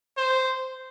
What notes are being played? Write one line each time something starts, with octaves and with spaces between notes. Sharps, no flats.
C5